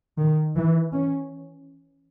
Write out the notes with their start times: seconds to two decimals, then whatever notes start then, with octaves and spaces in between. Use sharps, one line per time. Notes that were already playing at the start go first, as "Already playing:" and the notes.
0.18 D#3
0.56 E3
0.93 C#4